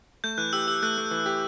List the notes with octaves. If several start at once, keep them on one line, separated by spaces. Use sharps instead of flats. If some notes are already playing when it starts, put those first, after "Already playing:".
A3 G6
E3 F#6
G4 E6
G4 E6
A3 F#6
A3
E3
G4